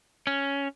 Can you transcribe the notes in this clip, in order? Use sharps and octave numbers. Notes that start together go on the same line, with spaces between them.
C#4